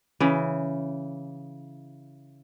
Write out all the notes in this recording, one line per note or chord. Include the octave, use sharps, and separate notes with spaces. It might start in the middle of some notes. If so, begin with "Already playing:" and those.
C#3 E3